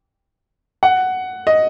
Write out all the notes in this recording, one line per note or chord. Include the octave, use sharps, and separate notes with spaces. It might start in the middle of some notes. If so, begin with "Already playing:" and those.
F#5
D#5